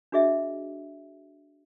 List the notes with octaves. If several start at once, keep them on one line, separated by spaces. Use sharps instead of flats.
D4 F#4 G#4 D#5 E5